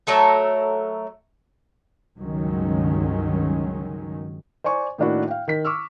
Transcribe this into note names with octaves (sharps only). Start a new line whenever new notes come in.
F#3 A3 A4 A#4
C#2 G2 D#3 F#3 G#3 C#4
C5 D5 G#5 C#6
A2 D#3 A#3 D4 E4 F#4
F5 G5
D#3 B6
C#6 D6 E6 F6